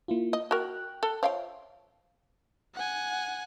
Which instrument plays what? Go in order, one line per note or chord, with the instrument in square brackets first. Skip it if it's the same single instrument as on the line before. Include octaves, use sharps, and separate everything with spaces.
[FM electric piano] A#3 E4 F4
[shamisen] D#5
[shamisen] F#4 A#4 [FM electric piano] G5 F#6
[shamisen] A4
[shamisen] F3 F5 G5 [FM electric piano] C#5 E5
[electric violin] F#5 G#5